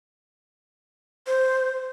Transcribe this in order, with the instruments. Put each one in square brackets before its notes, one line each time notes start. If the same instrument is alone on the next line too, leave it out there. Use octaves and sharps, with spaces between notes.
[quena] C5